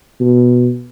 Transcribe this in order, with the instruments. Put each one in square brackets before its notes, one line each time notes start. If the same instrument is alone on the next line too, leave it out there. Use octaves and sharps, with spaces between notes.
[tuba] B2